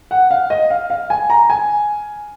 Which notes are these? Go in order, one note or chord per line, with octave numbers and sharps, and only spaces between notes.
F#5
F5
D#5
F5
F5
G#5
A#5
G#5